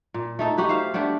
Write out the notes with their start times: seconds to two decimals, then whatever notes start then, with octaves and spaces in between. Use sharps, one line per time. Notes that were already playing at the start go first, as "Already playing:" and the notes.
0.14 A#2
0.39 A3 D#4 A4
0.57 D#4 F#4 G4 B4
0.69 C5 E5 F5
0.94 A3 B3 D4 G4